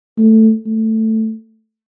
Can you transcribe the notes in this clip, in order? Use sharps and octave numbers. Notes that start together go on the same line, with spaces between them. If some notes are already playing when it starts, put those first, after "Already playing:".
A3
A3